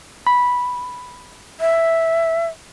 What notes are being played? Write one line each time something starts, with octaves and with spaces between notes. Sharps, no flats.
B5
E5